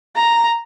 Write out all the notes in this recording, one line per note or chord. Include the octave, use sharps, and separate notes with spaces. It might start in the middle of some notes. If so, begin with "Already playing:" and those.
A#5